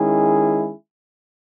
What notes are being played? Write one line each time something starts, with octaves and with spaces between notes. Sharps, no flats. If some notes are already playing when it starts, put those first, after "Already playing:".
Already playing: D#3 G#3 C#4 E4 G#4